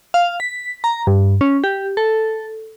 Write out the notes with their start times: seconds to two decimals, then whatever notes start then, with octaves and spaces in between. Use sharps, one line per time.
0.14 F5
0.40 B6
0.84 A#5
1.07 G2
1.41 C#4
1.64 G4
1.97 A4